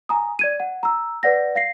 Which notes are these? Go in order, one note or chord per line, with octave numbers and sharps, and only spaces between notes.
G#5 A#5 D#6
D5 G#6 D#7
F#5
A#5 E6
B4 D5 F#5 A#6
F5 A#6 C7